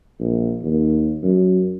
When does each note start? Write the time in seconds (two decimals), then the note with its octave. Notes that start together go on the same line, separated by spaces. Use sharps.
0.20 A#1
0.62 D#2
1.23 F#2